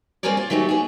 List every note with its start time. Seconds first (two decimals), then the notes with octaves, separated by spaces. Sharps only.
0.23 G3 C4 G#4 A#4 C#5 D5
0.37 F4
0.50 D#3 F#3 A3 C#4 G4
0.69 B3 G#4